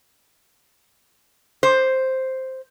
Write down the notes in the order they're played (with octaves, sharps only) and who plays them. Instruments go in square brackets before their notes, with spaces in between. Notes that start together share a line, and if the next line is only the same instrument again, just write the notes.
[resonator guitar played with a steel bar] C5